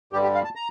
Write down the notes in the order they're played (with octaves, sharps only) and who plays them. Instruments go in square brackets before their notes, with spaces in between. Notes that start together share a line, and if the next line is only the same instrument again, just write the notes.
[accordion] G2 D3 G3 G4
G4
F5
A5
A#5